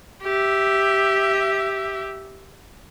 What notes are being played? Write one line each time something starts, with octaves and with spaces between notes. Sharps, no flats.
G4 E5